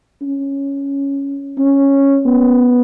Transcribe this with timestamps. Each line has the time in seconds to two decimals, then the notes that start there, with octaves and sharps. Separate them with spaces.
0.21 C#4
1.58 C#4
2.26 B3